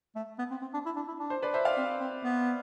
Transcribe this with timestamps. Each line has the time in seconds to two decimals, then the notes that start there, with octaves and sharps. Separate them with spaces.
0.15 A3
0.39 B3
0.51 C4
0.61 C4
0.73 D4
0.85 E4
0.96 D4
1.08 E4
1.19 D4
1.30 C5
1.42 B4 D5
1.54 C5 E5
1.65 D5 F5
1.77 C4
2.00 C4
2.24 B3